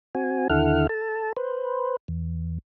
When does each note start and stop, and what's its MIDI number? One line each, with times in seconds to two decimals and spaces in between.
0.15 0.48 60
0.15 0.48 66
0.15 0.48 80
0.50 0.87 39
0.50 0.87 50
0.50 0.87 64
0.50 0.87 69
0.50 0.87 78
0.50 0.87 89
0.89 1.33 69
0.89 1.33 81
1.37 1.97 71
1.37 1.97 72
2.08 2.58 40